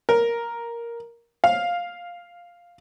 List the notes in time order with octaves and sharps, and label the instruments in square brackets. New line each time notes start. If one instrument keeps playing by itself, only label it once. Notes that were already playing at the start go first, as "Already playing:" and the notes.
[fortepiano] A#4
F5